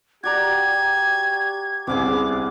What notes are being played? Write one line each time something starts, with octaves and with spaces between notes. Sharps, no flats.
F#4 G4 D5 A#5 G#6
C2 C3 B3 C#4 G#4 C5 D6